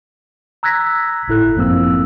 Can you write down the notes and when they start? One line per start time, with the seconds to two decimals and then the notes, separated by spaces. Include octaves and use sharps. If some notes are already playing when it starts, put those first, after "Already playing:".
0.63 A#5 E6 F#6 G#6 A#6 B6
1.28 G1 A2 E4 A4 F#6
1.56 F#2 F3 A#3 C4 E6